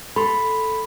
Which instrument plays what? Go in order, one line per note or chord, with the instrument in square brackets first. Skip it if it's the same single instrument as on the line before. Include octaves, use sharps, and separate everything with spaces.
[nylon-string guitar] A4 [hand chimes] B5 C6